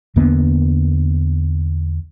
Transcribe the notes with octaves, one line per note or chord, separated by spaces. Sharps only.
E2 D3 A#3 B3